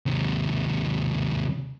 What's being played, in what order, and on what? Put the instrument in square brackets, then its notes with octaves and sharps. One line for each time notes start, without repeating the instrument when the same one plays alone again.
[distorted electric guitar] D#2 C3